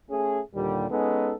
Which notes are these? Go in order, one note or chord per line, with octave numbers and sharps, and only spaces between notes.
A3 C#4 G#4
D#2 A#2 D3 G3
G#3 B3 C#4 D#4 A4